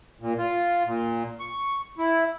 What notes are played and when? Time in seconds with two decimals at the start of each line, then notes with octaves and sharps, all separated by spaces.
0.21 A#2
0.39 F4
0.85 A#2
1.40 C#6
1.98 E4